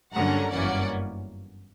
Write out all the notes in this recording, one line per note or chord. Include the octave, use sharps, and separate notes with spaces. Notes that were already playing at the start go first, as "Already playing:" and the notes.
G2 D3 F#3 A#3 C#4 F#5 A#5
G1 F#2 E3 A#3 C#4 D5 F#5